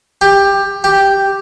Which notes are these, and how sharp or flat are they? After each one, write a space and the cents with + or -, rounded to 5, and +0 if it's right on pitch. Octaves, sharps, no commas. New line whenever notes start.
G4 +15
G4 +0